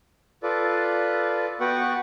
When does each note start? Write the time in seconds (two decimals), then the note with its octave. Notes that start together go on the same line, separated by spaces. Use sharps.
0.43 F4 A4 B4 D5
1.61 B3 F#4 B4 F#5 G5 C#6